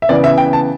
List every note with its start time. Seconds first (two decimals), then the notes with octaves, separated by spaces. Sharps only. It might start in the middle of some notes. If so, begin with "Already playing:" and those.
0.02 E5
0.09 C#3 E3 B3 D5
0.24 E5
0.38 G5
0.53 A5